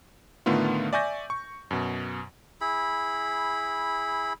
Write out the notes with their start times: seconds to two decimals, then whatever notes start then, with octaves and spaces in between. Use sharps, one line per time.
0.46 A2 D3 D#3 A3 B3 F4
0.93 D5 E5 G#5 C#6 G6 A#6
1.30 C#6
1.71 F#2 B2
2.61 E4 G#4 B5